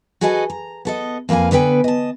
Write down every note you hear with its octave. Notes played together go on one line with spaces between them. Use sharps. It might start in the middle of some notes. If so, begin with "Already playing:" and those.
F#4 G#4 A4 B4 D#5 G#5
A#5
B3 A4 D#5
F2 A#3 B4 F5 G#5
D3 B3 B4 G5 G#5
D#5 A5